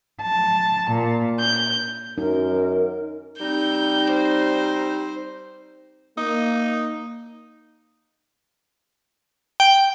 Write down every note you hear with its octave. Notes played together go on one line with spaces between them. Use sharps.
A5
A#2
G6
F#2 D#4 A#4
G3 C4 D#4 G6
C5
A#3 D#4
G5